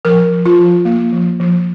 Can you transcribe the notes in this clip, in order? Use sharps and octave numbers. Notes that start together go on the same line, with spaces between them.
F3 A#4
F3
F4
F3
A#3
F3
F3